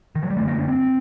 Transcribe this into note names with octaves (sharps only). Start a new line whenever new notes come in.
D#3
F#3
G3
F#2 D3 A3
A#3
D4
C4